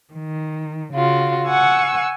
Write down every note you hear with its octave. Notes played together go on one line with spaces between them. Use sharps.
D#3
C#3 F4 F#4
F#5 G#5 C#6 E6